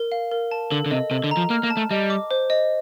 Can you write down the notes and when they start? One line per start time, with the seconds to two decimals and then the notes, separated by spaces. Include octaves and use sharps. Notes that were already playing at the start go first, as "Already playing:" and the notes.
Already playing: A#4
0.12 F5
0.31 A#4
0.51 A5
0.71 D3 A4
0.86 D3
0.91 C3 D#5
1.11 C3 A4
1.24 D3
1.31 A#5
1.37 F3
1.50 A#3 F6
1.63 A#3
1.70 A5
1.77 A3
1.91 G3 D#5
2.10 D6
2.31 C5
2.50 D#5